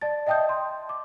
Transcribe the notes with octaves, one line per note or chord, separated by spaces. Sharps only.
D5 A5 A6
D#5 E5 G5 A5 D#6 G6
C6
D6